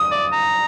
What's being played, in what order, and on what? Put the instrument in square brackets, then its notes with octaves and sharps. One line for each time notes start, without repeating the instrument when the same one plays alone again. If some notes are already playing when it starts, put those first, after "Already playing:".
Already playing: [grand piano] D#6
[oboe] D5
A#5